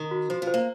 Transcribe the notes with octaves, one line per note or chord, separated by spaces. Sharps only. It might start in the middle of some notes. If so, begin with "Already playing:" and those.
Already playing: D#3
F#4
F3 C5
F3
C5
A#3